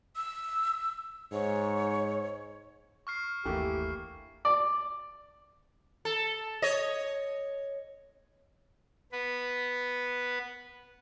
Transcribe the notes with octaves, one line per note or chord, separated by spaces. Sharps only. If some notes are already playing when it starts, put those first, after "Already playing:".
E6
G#2 C#5
C#6 F6 C7
G1 D#2 E3 A3 A#3 G4
D5
A4
C#5 D#5
B3 B4